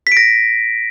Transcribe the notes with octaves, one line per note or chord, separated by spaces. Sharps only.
B6
D7
A#6